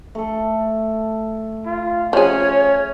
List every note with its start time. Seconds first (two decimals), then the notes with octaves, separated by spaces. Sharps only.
0.15 A3 A4
1.66 F4
2.13 F3 C#4 G#4 C#5